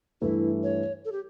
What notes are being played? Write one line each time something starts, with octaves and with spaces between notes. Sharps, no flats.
G2 E3 A3 E4
C#5
A4
G4